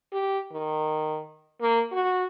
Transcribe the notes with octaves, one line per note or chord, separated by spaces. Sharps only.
G4
D#3
A#3
F#4